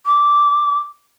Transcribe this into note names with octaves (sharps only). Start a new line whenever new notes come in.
D6